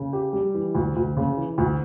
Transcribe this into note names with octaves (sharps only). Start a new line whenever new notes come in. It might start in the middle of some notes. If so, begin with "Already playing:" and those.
Already playing: C#3
G4
G3
E3
D2
D2
C#3
E3
D2